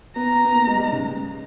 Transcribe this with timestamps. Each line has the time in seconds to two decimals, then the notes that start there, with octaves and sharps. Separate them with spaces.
0.16 B3 A#5
0.45 B3
0.55 A#3
0.67 G#3
0.74 G3
0.80 G#3
0.92 C#3